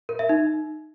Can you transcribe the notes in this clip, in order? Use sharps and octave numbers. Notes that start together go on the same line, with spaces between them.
A#4
E5
D#4